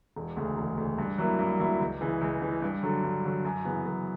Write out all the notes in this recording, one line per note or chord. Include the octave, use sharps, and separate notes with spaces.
E1
D2 C#3
E1
D2 C#3
G2
F#3 A#3 E4
G2
F#3 A#3 E4
C#2
C#3 E3
C#2
C#3 E3
G2
D3 F#3
G2
D3 F#3
F#2
C#3 E3 B3
F#2